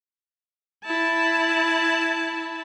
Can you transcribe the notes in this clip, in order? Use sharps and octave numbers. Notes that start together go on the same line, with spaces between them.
E4 A5